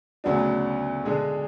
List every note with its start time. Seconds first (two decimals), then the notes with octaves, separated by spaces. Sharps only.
0.24 D2 C#3 F#3 B3 D4
1.05 D3 G#3 D4 G#4